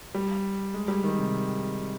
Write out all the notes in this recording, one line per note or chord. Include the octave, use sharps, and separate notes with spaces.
G3
G#3
G3
D#3
C3